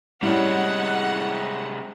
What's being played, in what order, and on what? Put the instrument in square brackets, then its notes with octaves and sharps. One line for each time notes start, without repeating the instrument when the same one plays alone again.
[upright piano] A2 [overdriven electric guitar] C3 G#3 [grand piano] G3 C#4 [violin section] F#5